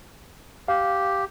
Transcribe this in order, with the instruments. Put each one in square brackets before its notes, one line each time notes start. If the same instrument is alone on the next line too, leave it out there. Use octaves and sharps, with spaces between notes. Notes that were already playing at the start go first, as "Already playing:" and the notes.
[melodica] G4 [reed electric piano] F5